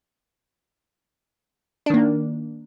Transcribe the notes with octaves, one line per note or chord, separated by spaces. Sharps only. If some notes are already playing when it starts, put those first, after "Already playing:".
D#3 A#3 D4